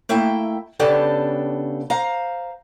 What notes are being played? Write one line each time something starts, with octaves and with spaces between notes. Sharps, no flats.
A3 A#3 E4 E5 G5
C#3 B3 D4 G4 A4
C5 F5 A#5